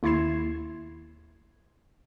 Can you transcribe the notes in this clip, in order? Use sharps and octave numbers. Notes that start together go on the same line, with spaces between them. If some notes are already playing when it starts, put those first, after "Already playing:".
D#2 E4 C6 G#6 C7 E7